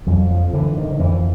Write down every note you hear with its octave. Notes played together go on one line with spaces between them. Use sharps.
F2 F#3
F3
D3 E3
D#3
D#3
F2 E3